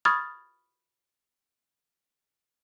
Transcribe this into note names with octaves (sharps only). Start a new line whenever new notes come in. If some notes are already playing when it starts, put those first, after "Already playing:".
B5 C#6 D#6 F6 G#6 A6